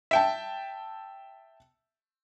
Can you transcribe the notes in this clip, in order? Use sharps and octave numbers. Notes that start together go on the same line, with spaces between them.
E5 G5 A5